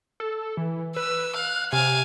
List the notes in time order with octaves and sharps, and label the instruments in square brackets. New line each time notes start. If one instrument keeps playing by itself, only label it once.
[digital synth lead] A4
E3
[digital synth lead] B4 [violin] E6
[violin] F5 [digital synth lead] F#6
[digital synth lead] C3 [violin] F5 G#5